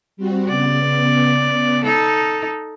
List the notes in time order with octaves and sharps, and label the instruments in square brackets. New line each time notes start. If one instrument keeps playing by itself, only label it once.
[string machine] G3 C4 F#4
[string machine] C#3 B3 [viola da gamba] D5
[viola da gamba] D#4 A4